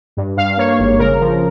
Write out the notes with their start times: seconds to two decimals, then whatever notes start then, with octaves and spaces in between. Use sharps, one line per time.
0.17 G2
0.37 G2 F5
0.57 A#3 C#5
0.79 G#1
0.99 C#3 A#4
1.20 F3